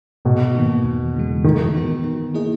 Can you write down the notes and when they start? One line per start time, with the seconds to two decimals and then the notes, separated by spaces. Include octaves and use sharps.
0.25 G#2 B2
0.55 D#3 A#3 D#4
0.84 E2
1.14 C#3 E3 G#3
1.44 D#3 E3
1.74 B3 F#4 A#4
2.04 D#3
2.34 A#3 E4 G#4 D#5